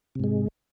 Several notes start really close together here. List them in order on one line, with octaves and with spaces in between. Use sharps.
C3 G#2 G#3